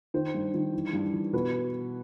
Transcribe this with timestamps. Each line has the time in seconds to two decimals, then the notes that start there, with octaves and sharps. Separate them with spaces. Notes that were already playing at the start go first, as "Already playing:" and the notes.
0.14 D#3 C5
0.34 G2
0.54 D#3
0.73 E3
0.93 G2
1.13 E3
1.33 B2 B4